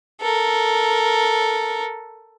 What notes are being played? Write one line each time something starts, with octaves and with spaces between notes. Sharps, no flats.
A4 A#4